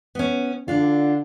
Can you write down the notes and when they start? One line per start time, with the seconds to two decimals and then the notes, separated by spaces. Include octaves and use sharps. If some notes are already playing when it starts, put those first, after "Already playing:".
0.15 B3 C#4
0.68 D3 D4 F4